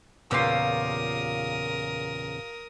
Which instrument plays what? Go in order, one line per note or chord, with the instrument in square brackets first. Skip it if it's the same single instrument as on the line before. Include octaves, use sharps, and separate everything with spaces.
[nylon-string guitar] E2 A#2 C#3 [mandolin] F4 G4 E6 [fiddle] A#4 D#6